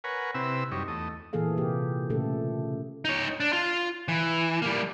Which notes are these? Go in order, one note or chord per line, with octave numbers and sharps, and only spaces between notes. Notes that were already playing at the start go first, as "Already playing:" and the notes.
A#4 B4 C#5 F#5 G#5
C3 C4 E4 B4 E6
F#2 G3 D#4 C#5
E2 A3 D#5
A#2 E3 A#3 G#4 A4 F5
C3 A#3 G4
A#2 C#3 A3 G4 A4
D#4 C#5
D4
F4
E3
G3 A#3